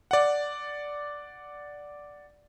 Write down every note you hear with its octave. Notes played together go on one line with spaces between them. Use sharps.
D5 F#5